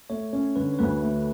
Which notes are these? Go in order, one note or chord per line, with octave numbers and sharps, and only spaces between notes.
A3 C#5
C#4 C#5
D3 B4
C#5
D2 B4
A3